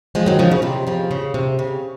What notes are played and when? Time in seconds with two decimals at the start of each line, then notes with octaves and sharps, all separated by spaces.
0.15 F3 G#3
0.26 D#3 F#3
0.39 C#3 F3
0.51 C#3
0.62 C3 D#3
0.87 C#3 F3
1.11 C#3
1.34 C3
1.59 C#3